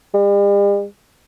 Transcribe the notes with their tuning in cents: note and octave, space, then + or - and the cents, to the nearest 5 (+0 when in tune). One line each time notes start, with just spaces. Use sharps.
G3 +45